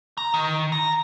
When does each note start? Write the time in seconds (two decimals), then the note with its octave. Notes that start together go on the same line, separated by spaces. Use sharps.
0.18 A#5
0.34 D#3
0.72 A#5